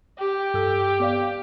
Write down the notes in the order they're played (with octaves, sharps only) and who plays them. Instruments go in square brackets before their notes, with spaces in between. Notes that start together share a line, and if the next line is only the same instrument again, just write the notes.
[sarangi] G4
[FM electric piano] G2 A4 E6
B3 D5 F5